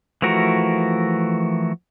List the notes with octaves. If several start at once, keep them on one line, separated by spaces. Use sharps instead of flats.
E3 F3 A3 F#4 A#4